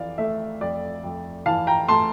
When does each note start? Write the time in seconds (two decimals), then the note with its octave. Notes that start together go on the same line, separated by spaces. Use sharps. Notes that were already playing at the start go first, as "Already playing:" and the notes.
Already playing: F2 E3 D5 F5
0.18 A3 E5
0.61 F2 D5
1.03 F2
1.46 E3 F5 A5
1.67 G5 A#5
1.88 A3 A5 C6